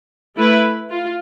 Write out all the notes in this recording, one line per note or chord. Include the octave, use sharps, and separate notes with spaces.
A3 E4 B4
F4